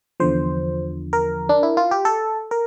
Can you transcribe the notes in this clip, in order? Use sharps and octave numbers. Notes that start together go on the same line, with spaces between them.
E2 D3 F3 C5
A#4
D4
E4
F4
G4
A4
A#4